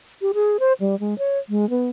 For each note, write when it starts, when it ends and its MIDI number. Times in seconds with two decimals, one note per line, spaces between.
0.22 0.32 67
0.34 0.57 68
0.60 0.73 72
0.80 0.99 55
1.00 1.17 56
1.19 1.38 73
1.49 1.68 56
1.70 1.90 59